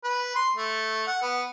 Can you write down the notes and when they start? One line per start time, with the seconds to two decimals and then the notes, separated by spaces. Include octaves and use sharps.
0.04 B4
0.36 C6
0.56 A3
1.07 F#5
1.22 B3